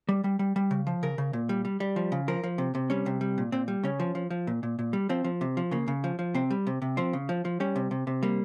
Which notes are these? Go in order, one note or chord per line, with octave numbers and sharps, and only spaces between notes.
G3
G3
G3
G3
C#3
F3
C#3 A#4
C#3
A#2
G3
G3
G3
F3
C#3
F3 A#4
F3
C3
C3
G3 C#4
C3
G3
A#2
A#2 C4
G3
C#3 C#4
F3
F3
F3
A#2
A#2
A#2
G3
F3 C4
F3
C3
F3
C#3 A#3
C#3
F3
F3
C3 C4
G3
C3
C3
F3 C4
C#3
F3
F3
G3 C#4
C3
C3
C3
G3 A#3